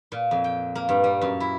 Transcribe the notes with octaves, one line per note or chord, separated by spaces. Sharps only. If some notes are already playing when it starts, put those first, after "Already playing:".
A#2
F2
G5
A#3
G2
G3
F#2
E4